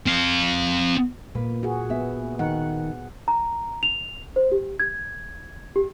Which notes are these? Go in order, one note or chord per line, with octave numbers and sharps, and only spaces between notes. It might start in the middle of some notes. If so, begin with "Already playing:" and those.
C4 F5
A#2 A#3 B4
F#4 G#4
B3 E5
D#3 F#5 G5
A#5
F7
C5
G4
G#6
G4